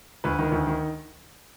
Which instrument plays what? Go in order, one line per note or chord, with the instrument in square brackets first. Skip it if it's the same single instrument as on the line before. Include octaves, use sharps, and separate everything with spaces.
[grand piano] D2 B4
D#3
D2
D#3